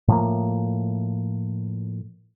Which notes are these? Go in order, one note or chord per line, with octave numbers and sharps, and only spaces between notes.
A2 F3 A#3